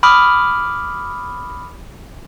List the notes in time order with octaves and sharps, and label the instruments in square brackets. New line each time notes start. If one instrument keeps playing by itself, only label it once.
[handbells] B5 D6 D#6 F6